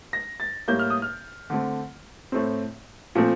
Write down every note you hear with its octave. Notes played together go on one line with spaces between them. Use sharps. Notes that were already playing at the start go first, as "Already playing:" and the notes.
A#6
A6
A2 G3 A#3 G6
F6
D#6
F6
D3 A3 C4
A2 A3 C4
A#2 F3 A3 C4